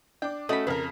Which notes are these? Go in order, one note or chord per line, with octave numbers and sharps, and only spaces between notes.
D4 G5 D6
A3 C#4 F#4 D#5 B5
F2 C#3 A#4 B4 B6